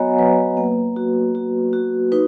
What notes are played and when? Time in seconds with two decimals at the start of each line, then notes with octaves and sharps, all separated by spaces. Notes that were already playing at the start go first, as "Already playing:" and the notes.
Already playing: F#3 B3 F#4 C#5 D#5 F#5 G#5 A#5
0.19 F#3 B4
0.57 A#3
0.96 F#4
1.35 F#4
1.73 F#4
2.12 D#4 B4